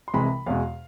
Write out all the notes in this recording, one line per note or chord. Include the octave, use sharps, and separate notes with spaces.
C6
C2 C3 E3 G#3 B5
E2 B2 G#3 F5